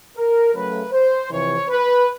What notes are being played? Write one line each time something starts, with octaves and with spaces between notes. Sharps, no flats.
A#4
C#3 F#3 A3 B4
C5
F2 C3 E3 C#5
B4